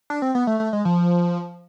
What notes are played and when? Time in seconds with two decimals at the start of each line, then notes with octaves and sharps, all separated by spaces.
0.10 D4
0.22 C4
0.35 B3
0.47 A3
0.60 A3
0.73 G#3
0.85 F3